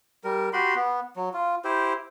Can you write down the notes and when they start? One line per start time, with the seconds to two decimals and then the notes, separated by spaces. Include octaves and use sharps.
0.24 G3 A#4
0.53 F#4 G4 B5 C6
0.75 B3
1.16 F#3
1.34 F4
1.64 E4 G4 C5